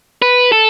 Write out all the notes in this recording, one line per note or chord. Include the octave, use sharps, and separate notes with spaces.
B4
A4